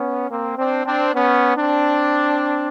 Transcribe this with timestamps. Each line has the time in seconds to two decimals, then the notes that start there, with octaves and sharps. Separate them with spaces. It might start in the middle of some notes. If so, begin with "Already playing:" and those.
Already playing: B3 C#4
0.29 A#3 C4
0.57 C4 D4
0.85 C4 D4
1.13 B3 C#4
1.56 C4 D4